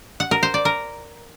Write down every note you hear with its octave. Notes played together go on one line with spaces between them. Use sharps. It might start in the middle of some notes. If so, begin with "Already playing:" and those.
F#5
A#4
C5
D5
A#4